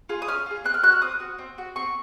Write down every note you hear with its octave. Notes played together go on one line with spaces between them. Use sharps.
F4 G#4
D#6
C#4 F6
F4 G#4
C4 F#6
F6
F#4 F#6
F6
C4 D#6
F#4
C4
F#4
C4 C#6